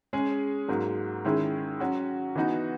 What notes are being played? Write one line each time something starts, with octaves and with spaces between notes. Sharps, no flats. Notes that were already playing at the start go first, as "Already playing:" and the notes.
G#3 C#4 G#4
G#2 F#3 A#3
D#3 G#3 C#4 E4 G#4
F#3 C#4 F#4
E3 B3 D#4 F#4